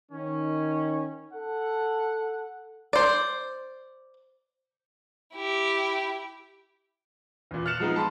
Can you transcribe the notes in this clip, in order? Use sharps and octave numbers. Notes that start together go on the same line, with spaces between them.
D#3 C#4
A4 F#5
C5 D5
E4 G4
E2 A#2
F6 F#6 A6 C#7 E7 F7
F3 G#3 B3 D#4
A5 B5 C6